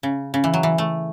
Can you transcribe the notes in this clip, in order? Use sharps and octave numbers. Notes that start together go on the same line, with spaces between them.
C#3
C#3
E3
F#3
E3
A3